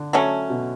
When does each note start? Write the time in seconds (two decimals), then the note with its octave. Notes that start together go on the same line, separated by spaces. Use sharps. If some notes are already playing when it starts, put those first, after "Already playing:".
Already playing: D3
0.13 F#3 A3 C#4
0.50 B2